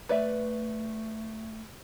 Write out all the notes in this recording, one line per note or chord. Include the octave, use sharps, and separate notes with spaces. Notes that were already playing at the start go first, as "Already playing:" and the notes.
A3 B4 D5 E5